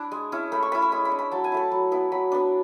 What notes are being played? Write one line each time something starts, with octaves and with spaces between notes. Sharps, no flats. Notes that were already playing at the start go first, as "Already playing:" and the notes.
Already playing: D4 E4
G#3
C#4 E4
A3 B5
C#6
C#4 E4 B5
C#6
G#3 B5
B5
D4
B5
F#3 A5
G#5
A3 E4 A5
F#3
B3 E4
F#3 B5
B3 D4